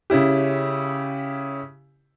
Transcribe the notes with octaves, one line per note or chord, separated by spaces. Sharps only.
C#3 C#4 E4 G4